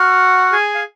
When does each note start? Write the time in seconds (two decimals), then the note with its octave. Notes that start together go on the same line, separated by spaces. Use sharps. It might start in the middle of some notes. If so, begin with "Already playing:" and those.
Already playing: F#4 F#5 F6
0.52 G#4 G#5
0.75 F5